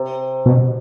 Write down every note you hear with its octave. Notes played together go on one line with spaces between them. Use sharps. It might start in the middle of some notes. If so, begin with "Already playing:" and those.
Already playing: C3
B2